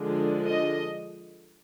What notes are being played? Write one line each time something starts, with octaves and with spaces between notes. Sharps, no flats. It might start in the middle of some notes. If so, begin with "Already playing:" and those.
Already playing: D3 F3 G#3 D4
D#5